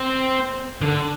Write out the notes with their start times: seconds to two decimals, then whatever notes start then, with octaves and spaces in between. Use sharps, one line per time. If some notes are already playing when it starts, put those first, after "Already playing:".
Already playing: C4
0.82 D3